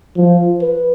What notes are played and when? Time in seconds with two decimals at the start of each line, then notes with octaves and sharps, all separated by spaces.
0.17 F3
0.61 B4